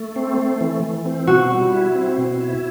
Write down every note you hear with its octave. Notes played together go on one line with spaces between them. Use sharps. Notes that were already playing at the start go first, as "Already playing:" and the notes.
Already playing: A3
C4
A3
E3
E3
C4
B2 F#4
G3
E4
C4
B2
E4